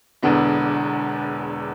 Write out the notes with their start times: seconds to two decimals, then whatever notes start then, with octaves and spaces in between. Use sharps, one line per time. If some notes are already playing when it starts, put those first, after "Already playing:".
0.22 E1 E2 D3 B3 D4